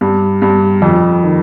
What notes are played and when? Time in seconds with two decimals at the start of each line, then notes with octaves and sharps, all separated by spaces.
0.01 G2
0.42 G2
0.82 F2
1.23 D#3